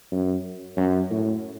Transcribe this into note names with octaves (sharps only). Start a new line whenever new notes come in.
F#2
F#2
A2